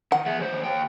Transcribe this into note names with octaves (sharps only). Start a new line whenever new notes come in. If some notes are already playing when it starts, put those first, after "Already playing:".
D#3 F#5
G#4 E5
D#2 C5
D#2 G5